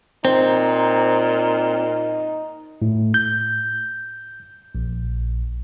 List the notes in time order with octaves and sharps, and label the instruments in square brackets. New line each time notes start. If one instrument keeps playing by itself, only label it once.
[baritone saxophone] A#2 [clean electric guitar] C4 [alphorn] D#4 [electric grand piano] C5
[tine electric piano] A2
G6
A#1